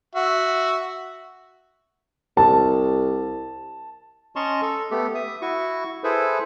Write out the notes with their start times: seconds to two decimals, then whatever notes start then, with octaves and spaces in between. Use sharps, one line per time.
0.15 F#4 E5
2.37 C2 A5
4.36 C#4 D#5 A5 A#5 C6 C#6
4.61 A4
4.91 A3 B3 G4 A4
5.15 E5 D#6
5.41 E4 F#4 C#6
6.04 E4 G#4 A4 B4 C5